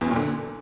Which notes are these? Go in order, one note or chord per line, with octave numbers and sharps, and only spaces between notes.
E2
F#2
A#2
D3